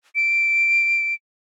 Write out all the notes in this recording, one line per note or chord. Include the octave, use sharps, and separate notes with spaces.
D7